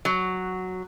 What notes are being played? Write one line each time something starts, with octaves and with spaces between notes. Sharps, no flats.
F#3